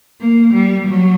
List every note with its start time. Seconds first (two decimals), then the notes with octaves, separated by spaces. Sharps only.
0.21 A#3
0.54 G3
0.87 F#3